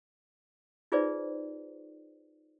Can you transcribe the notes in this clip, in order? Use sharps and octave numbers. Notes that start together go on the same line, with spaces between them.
D#4 F4 G#4 B4 C5 D5